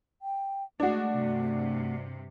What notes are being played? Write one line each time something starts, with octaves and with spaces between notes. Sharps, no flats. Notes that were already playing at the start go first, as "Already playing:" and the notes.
G5
G#3 A3 D4 F#4
G2 C3